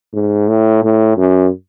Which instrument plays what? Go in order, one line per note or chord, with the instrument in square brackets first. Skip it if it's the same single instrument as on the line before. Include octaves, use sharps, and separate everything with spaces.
[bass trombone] G#2
A2
A2
F#2